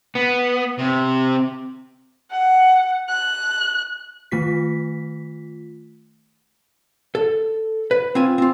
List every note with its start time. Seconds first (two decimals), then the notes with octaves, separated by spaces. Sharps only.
0.15 B3
0.78 C3
2.31 F#5
3.09 F#6
4.32 D#3 A3 F4 B6
7.15 A4
7.91 B4
8.15 C4 F4 G#5
8.38 C4 F4